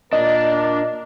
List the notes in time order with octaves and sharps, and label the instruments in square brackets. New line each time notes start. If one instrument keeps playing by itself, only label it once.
[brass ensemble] A#2 A#4 D5 [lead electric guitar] D4 [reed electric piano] D#5